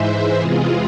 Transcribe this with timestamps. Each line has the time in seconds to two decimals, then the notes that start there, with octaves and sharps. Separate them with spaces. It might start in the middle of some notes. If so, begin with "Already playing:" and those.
Already playing: G#2 E3 G#3 C5 E5
0.37 E2 C3 E3 G#3 F4 G#4